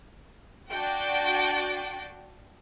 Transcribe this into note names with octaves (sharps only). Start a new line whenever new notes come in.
D4 F#4 D5 G5